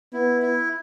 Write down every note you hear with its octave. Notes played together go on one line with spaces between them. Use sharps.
B3 E4
E4